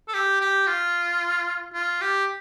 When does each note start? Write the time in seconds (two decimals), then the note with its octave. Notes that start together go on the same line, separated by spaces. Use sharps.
0.08 A4
0.14 G4
0.41 G4
0.67 F4
1.74 F4
2.01 G4